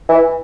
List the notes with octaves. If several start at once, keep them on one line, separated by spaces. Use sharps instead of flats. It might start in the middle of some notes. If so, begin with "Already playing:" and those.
E3